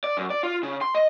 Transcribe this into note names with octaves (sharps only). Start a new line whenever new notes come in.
D5
F#2
D5
F4
C#3
C6
D#5